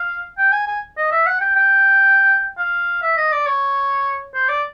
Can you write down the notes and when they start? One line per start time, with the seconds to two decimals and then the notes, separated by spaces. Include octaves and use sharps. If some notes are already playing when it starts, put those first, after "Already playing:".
Already playing: F5
0.38 G5
0.52 G#5
0.67 G#5
0.97 D#5
1.11 E5
1.26 F#5
1.40 G5
1.56 G5
2.58 F5
3.02 E5
3.17 D#5
3.32 D5
3.47 C#5
4.34 C5
4.49 D5